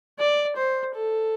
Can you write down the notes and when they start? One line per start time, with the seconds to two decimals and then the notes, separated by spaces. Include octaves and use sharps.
0.19 D5
0.57 C5
0.95 A4